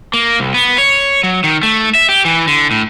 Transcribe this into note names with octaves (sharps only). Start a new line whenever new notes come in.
A#3
C2
B3
C#5
F#3
D#3
A3
E5
G4
E3
D3
A2